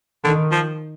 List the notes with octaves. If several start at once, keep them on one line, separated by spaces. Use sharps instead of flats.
D3 D#3
F3